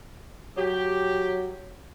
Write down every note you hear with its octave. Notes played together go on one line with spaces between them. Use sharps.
F#3 G4